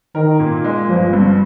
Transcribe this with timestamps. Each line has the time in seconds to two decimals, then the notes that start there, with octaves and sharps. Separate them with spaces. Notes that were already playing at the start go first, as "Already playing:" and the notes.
0.15 D#3 A#4
0.39 A#2
0.64 G#3
0.89 G1 F3
1.13 G2